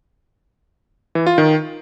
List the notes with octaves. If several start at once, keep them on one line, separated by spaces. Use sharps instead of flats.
E3
F4
D#3